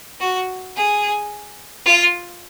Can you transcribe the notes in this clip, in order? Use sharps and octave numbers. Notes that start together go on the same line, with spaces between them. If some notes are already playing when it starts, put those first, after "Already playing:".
F#4
G#4
F4